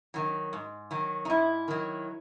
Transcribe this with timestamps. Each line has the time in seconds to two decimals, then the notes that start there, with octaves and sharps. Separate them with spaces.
0.14 D#3 F#3
0.53 G#2
0.91 D#3 F#3
1.25 D#4
1.30 G#2 E4
1.68 D#3 F#3